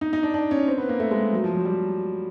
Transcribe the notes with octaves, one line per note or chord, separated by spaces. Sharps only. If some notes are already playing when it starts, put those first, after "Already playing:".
D#4
D#4
D4
D4
C#4
C4
B3
A#3
A3
G#3
F#3
F3
F#3
G3